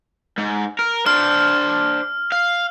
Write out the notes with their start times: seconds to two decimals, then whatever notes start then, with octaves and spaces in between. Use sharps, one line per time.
0.38 G#2
0.79 A#4
1.06 D4 C5 F6
2.32 F5